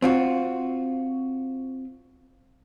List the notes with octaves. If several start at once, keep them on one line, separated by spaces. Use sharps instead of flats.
C4 F4 F#4